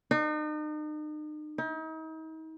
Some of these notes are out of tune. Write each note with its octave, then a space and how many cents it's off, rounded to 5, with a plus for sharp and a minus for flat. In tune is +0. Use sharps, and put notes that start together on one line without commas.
D#4 -40
D#4 +40